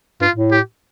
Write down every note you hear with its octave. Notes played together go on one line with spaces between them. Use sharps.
G2 F4
A2
G4